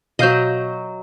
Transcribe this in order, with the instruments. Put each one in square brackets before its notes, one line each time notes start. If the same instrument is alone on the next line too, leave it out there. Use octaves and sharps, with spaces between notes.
[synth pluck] B2 F5 G6 [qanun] F#3 D#5